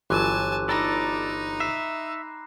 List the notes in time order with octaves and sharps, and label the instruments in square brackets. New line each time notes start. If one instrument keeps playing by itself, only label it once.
[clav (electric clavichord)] G1 E3 F#3 [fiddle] G#5 A5 [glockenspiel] C6 D6 F#6
[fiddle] D#4 [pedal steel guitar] A4 D5 [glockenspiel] A#5 B5 A#6
[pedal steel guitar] E5 [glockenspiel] C7